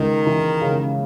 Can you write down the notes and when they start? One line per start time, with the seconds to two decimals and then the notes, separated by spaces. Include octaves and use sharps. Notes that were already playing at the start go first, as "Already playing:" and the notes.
Already playing: C#2 D#3
0.27 E3
0.61 C#3